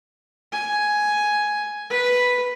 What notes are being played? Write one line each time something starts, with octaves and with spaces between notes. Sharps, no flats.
G#5
B4